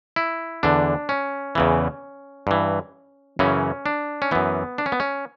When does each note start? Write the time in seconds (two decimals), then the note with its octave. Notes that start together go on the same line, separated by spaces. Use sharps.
0.16 E4
0.63 E2 D3 D4
1.09 C#4
1.55 E2 C#3 E3
2.47 G2 E3
3.39 F#2 C#3 E3 C#4
3.86 D4
4.22 C#4
4.31 F#2 E3 B3
4.78 D4
4.86 C#4
4.92 B3
5.00 C#4